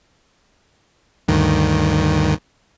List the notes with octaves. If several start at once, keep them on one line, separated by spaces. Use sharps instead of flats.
D2 G2 D#3